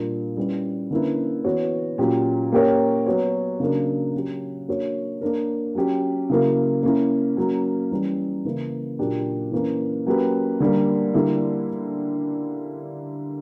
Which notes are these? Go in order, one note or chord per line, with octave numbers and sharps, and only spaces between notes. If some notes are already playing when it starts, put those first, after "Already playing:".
Already playing: A#2 G3 A#3 D4
G3 C#4 E4 B4
D3 A#3 C#4 E4 B4
E3 B3 F#4 C#5
A#2 F#3 C#4 G4
A#3 C#4 G4 A#4 C#5
F#3 B3 F#4 C#5
C#3 F#3 A#3 D4 A#4
F#3 C#4 G4
A#3 D4 F#4 C#5
A#3 D4 A#4
F#3 C#4 G4
C#3 F#3 A#3 E4 A#4
A#3 C#4 E4
F#3 A#3 C#4
E3 G3 C#4
C#3 E3 A#3 E4
A#2 F#3 A#3 D4 G4
E3 A#3 C#4
F#3 A#3 C#4 G4 B4
D3 G3 A#3
D3 G3 A#3 E4